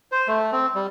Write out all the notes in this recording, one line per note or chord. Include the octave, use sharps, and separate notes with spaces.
C5
A3
C4
G3